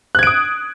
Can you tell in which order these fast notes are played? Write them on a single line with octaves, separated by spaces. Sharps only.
F#6 G#6 D7 D#6